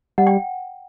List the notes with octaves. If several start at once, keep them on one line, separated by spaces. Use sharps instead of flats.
G3 F#5
G5